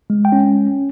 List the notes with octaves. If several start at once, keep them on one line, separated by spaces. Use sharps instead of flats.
G#3
G5
C#4